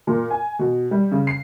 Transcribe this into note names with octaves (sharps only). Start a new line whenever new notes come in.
A#2
G#5
B2
G3
C#3
C7